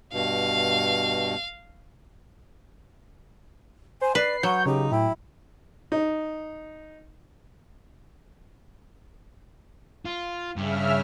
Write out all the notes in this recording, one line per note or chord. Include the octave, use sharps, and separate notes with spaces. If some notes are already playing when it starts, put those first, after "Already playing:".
G2 B2 F5
C5 G#5
B4 D5 C7
F#3 C#5 F#5 G6
C#3 D#4 G4
A2 E4 G5
D#4
F4
G2 C#3 G3 E5 F6